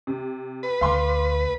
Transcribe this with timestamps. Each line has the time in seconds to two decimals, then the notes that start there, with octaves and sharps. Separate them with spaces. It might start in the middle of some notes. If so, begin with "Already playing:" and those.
0.07 C3
0.63 B4
0.81 D2 F5 C6 D6